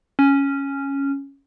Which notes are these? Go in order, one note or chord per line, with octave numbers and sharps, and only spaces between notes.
C#4